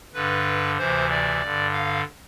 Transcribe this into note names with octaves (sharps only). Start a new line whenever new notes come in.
G2 D3 B4
D2 C3 E3 C5
D5
G2 D3
F5